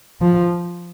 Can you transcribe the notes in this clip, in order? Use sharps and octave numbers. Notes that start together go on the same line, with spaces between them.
F3